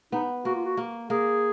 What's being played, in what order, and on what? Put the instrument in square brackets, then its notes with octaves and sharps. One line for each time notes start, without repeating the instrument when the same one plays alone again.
[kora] B3 [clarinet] D#4
[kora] A#3 [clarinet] F#4
[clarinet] F4
F#4
[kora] A#3
[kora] A#3 [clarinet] G#4